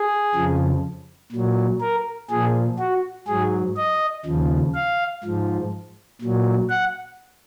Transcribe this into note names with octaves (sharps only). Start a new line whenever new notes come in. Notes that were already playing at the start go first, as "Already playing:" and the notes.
Already playing: G#4
F2 C#3 F3
A#2 F#3
A#4
A#2 F3 G#4
F#4
G#2 F#3 G#4
D#5
D#2 C#3 F3
F5
G#2 F3
A#2 F#3
F#5